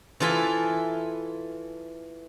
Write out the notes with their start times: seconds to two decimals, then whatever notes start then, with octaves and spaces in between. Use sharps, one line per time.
0.20 E3 F4 A4 G#5 B5